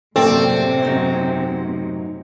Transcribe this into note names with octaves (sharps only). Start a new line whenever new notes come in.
F#2 A2 C3 A#3 C4 A4 D5
F#2 D#4 G5